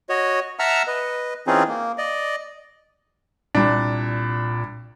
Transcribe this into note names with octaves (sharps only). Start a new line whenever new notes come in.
F#4 C#5 D#5
E5 F#5 A5 A#5 E6 F6
B4 D#5
E3 C4 C#4 D#4 F4 G#4
A#3
D5 D#5
C2 A#2 D4